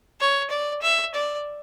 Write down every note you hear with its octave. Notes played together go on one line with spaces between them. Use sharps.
C#5
D5
E5
D5